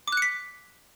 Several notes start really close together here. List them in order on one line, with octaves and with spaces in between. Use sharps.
D6 F#6 C#7 B6